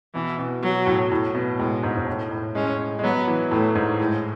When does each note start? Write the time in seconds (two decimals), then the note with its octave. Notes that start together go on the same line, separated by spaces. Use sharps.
0.15 B2 E3
0.39 B2
0.63 F#3
0.87 A2
1.12 A2
1.35 B2
1.59 A2 G#3
1.83 G#2
1.97 G#2
2.07 A2
2.31 A2
2.55 G#3 C#4
2.99 G#3
3.04 F#3 B3
3.28 E3
3.51 A2 A3
3.75 G#2
3.99 A2 G#3